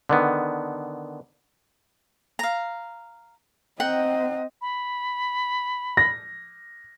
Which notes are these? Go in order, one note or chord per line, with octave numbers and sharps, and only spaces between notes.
D3 D#3 B3
F5 A#5
C4 D#5 F#5 G5 A#5
B5
A#6